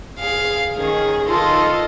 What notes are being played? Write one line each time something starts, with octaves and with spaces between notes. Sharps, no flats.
G#4 F5
D#3 C#4 G#4
D#3 F4 A4 D#5 C6